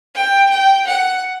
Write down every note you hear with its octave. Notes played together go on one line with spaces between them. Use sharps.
G5
G5
F#5